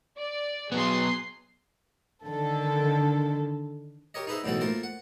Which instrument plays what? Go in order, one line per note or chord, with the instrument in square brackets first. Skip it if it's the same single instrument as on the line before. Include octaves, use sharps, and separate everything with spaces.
[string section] D5
[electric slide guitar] F#3 B3 [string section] G#4 C6
[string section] D3 D#3 A4
[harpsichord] G4 A#4 C#5 D#5
D#4 G#4 B4 C5 D#5 E5
B1 A2 D#3 E3 F#4 A4
A3 A#3 F4 A#4 C5
F#5